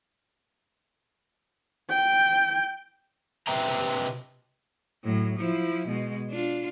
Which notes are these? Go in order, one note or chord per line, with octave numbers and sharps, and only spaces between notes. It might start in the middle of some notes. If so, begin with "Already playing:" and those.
G5
C3 C4 B4 E5 G5 A#5
A2 F#3
F3 E4
B2 G#3
D4 F4